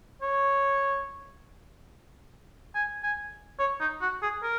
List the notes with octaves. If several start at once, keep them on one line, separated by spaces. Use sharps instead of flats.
C#5
G#5
G#5
C#5
D#4
F#4
G#4
A#4